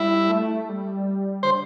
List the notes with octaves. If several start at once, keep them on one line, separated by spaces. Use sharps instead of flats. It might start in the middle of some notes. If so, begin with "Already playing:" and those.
Already playing: G3 E4
A3
G3
D3 C5